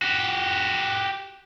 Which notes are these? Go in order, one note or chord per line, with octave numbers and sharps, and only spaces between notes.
F#4 G4